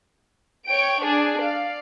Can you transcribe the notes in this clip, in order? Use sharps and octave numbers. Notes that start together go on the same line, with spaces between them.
C#5 G5 D7
D4 G#4 D5
D5 F5